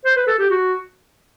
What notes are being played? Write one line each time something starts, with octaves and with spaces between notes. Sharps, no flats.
C5
B4
A4
G4
F#4